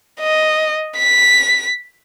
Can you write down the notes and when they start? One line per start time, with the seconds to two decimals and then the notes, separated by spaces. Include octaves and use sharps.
0.20 D#5
0.97 B6